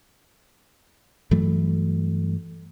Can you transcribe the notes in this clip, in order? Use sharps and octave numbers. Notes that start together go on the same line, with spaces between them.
G2 E3 F#3 A3